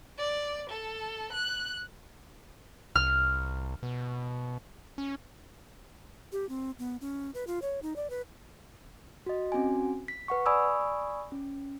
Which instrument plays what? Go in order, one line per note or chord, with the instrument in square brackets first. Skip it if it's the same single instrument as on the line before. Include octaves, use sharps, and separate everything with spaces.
[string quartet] D5
A4
F#6
[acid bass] C2 [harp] F6
[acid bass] B2
C#4
[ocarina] G4
C4
B3
C#4
B4
F4
C#5
D#4
D5
B4
[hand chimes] F#4 D#5
C4 C#4 F#4 G#5
B6
B4 F#5 C#6
D5 G#5 B5 C#6 D#6 E6
C#4